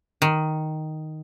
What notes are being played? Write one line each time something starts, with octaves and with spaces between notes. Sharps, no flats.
D#3